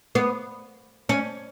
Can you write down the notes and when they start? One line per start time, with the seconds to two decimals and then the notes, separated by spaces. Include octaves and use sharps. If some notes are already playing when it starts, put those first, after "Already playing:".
0.15 B3
1.09 C#4